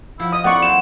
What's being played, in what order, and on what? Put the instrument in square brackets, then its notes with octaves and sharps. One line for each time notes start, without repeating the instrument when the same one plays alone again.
[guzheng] F3 [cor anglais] E4
[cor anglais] D#5 [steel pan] D#6
[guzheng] A#3 C4 E4 [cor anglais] D5 [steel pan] F#5 C#6
[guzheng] F#3 [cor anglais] C4 [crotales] E7